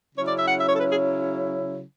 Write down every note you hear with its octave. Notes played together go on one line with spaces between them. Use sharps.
C#3 F#3 C#4 E4 C#5
D5
E5
F#5
E5
C#5
A4
B4
G#4